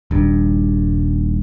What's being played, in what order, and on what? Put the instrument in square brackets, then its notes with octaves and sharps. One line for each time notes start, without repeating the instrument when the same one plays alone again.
[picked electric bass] D#1 G2